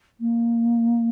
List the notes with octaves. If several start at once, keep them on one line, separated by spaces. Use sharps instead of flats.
A#3